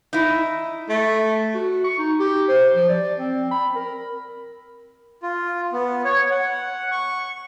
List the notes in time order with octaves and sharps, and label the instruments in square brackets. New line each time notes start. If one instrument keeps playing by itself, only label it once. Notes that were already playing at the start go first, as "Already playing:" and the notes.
[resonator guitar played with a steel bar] D#4 E4
[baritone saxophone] A3
[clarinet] F#4
C#6
D#4
G4
C5
F3
D5
C4
B5
A#4
[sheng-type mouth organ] F4
B3
C#5
F#5
C#6